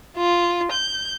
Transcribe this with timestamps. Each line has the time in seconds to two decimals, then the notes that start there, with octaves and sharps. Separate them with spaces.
0.17 F4
0.72 G6